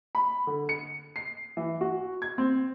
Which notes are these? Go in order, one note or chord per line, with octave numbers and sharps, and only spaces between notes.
B5
D3
C#7
C7
E3
F#4
G#6
C4